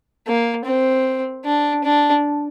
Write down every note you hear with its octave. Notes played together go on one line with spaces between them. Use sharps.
A#3
C4
D4
D4